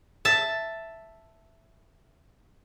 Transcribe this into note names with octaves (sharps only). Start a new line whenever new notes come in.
E5 A5